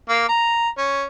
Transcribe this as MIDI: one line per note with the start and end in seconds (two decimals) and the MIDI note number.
0.09 0.25 58
0.29 0.69 82
0.78 1.05 61